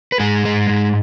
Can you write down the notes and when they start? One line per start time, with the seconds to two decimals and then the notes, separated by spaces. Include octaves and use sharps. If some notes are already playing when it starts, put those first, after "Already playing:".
0.12 B4
0.19 G#2 G#3 G#4
0.45 G#3
0.69 G#2